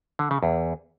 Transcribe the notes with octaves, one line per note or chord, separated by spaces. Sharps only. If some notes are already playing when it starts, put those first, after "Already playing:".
D3
C#3
E2